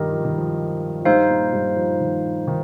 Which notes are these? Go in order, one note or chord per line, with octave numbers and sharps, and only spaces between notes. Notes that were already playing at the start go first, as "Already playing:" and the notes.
Already playing: G2 D#3 F3 G3 G4 A#4 D#5
F3
D#3
F3
F3
G2 G3 D#4 C5 F5
A#2 A#3
G2 G3
F3
D#3
D#3